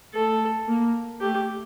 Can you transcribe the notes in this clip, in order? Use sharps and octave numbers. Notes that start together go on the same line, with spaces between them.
A3 A4
A#3
A3 G4